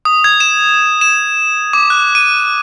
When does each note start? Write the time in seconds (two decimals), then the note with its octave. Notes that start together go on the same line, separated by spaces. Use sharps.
0.05 D#6
0.24 G#6
0.40 E7
1.01 E7
1.73 D6
1.90 F#6
2.15 D#7